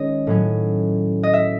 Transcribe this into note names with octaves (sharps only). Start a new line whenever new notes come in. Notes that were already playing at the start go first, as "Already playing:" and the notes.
Already playing: D#3 G#3 C#4 C#5 D#5
A2 F#3 C#4
D#5
E5